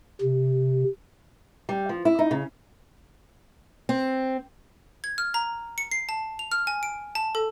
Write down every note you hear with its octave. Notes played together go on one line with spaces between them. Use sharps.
C3
G3
F3
E4
D#4
C#3
C4
G#6
F6
A#5
C#7
C7
A5
F7
F6
G#5
D7
A5
A4